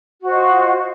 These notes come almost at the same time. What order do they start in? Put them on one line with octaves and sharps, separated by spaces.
F#4 C5 D#5 F4